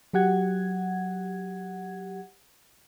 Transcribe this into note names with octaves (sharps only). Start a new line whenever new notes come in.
F#3 G4 F#5 G#6